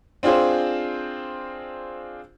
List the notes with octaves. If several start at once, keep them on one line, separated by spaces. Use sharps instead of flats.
C4 D4 F4 G#4 C5